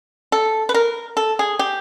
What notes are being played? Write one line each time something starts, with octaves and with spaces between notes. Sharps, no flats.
A4
B4
A#4
A4
G#4
G4